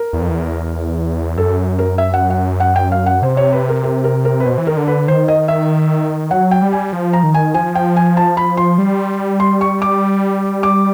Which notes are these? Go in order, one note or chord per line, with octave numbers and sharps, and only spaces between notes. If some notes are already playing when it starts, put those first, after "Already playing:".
Already playing: A#4
E2
F2
E2
F#2 A4
A#4
E5
F#5
F#5
F#5
G5
F5
F#5
C3 C5
C#5
B4
A#4
A#4
A#4
A#4
B4
B2 C5
E3
D#3 A#4
D3
B4
D#3 C5
D#5
E5
F#3 F#5
G5
G3
G#5
F3
A#5
D#3
G#5
F3 G#5
G5
G#5
A5
B5
C6
G3
C6
C#6
D6
D6